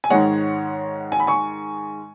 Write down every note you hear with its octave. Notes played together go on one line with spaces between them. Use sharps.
G#5
G#2 D#3 G#3 C#5 F#5
G#5
B5
G#5 C#6